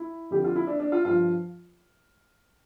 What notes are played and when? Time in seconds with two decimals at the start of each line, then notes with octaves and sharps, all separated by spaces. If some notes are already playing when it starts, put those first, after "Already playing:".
Already playing: E4
0.30 F2 D3 G3 G4
0.44 F4
0.56 E4
0.67 D4
0.80 D4
0.92 F4
1.05 G2 F3 F4